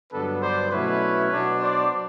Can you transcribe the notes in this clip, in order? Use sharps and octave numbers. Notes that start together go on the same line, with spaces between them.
G2 D3 F#3 B3 D4 A4 B4
C5 D5
B2 F#3 A3 C#4 E4 B4 C#5
B2 F#3 B3 D4
C5 D5